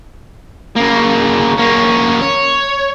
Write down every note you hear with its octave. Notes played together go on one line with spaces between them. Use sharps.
C#3 A#3
A#3 C#4
C#5